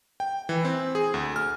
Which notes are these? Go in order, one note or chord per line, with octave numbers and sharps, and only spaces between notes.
G5
E3
C4
G#4
D2
F6